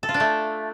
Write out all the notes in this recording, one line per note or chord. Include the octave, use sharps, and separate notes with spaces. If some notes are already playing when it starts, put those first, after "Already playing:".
A4
F4
D4
A3